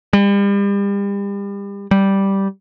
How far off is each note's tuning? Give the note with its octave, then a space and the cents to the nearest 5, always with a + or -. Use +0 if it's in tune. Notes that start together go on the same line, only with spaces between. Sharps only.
G3 +35
G3 -5